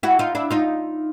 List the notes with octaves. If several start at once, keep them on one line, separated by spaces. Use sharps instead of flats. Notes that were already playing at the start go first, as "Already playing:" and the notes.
E4 F#4
D#4 F4
D4 E4
D#4 F4